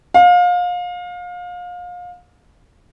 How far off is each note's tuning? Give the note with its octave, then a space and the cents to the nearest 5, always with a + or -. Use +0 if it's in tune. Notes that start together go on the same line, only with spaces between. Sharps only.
F5 +30